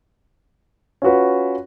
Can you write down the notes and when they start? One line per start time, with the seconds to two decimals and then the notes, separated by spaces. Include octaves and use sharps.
1.02 C#4 F4 F#4 B4